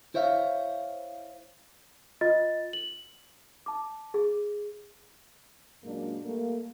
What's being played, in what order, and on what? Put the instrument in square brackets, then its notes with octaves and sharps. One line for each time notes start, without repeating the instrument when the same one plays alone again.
[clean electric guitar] E4 C5 C#5 E5 F5
[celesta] F4 D#5 A6
F#7
A5 D6
G#4
[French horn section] F#2 A#2 G#3 A#3 D4
G3 A3 A#3